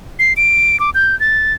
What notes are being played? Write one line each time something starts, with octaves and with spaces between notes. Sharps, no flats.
C7
D7
D6
G6
A6